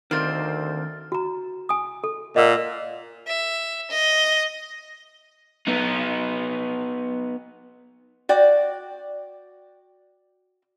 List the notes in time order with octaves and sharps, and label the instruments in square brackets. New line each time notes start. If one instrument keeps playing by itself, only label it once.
[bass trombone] D2 [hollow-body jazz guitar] D#3 [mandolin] A#3 C4 C5 [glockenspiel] F6 A6
[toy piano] F#4 A#5
G#5 D#6
A4
[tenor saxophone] A#2 [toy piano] D#5 F#5 E6
[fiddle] E5
D#5
[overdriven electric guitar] B3 D#4
[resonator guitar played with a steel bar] F#4 D5 G5